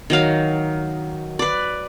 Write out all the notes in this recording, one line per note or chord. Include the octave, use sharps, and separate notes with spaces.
D#3 F#3 F5
B4 D5